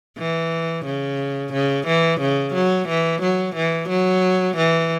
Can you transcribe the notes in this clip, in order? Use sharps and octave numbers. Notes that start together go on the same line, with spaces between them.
E3
C#3
C#3
E3
C#3
F#3
E3
F#3
E3
F#3
E3